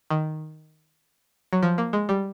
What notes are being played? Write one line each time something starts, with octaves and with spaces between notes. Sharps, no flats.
D#3
F#3
F3
A#3
G#3
G3